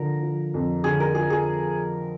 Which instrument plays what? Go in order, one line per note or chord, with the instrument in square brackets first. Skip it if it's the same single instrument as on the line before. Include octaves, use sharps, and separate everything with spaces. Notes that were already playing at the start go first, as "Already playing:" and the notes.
Already playing: [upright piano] D3 F3 [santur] A#4
[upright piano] F3
F2
[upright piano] D3 [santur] G#4
[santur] A#4
[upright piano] F3 [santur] G#4
[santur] G#4